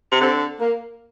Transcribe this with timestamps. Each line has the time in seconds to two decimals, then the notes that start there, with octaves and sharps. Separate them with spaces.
0.12 C3
0.21 D3 C4
0.60 A#3